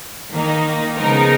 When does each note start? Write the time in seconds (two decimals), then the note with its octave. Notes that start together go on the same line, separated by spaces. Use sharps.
0.30 D#3 A#3 D#4
0.96 C#3 F3 G#3 B3 D#4 A#4